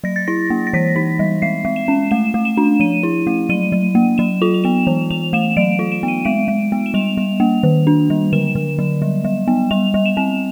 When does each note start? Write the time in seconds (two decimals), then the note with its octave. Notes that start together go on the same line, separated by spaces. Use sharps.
0.04 F#3 A#6
0.16 A6
0.27 E4 A#6
0.50 A#3
0.67 A#6
0.73 E3 B6
0.96 D#4
1.19 G3
1.42 G#3 C7
1.65 G#3
1.76 E7
1.88 C#4
2.11 A3 E7
2.34 A3
2.45 E7
2.57 D4
2.80 F3 D#7
3.03 E4
3.27 A3
3.49 F#3 D#7
3.72 F#3
3.95 A#3
4.18 F#3 E7
4.42 F4 F7
4.54 F7
4.64 B3 E7
4.87 E3
5.10 E3 F7
5.33 A3 E7
5.57 F#3 D7
5.79 F4
5.92 E7
6.03 B3
6.08 D#7
6.25 G#3 D7
6.48 G#3
6.72 B3
6.86 E7
6.94 G3 F7
7.17 G3
7.40 A#3
7.63 D#3
7.87 D4
8.10 G3
8.33 D3 E7
8.55 D3
8.79 F#3
9.02 G3
9.24 G3
9.48 B3
9.71 G3 F7
9.94 G3
10.06 E7
10.17 C4